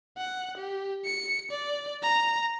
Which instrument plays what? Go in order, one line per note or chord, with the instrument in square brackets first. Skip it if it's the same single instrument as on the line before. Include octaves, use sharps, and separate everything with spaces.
[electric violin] F#5
G4
C#7
D5
A#5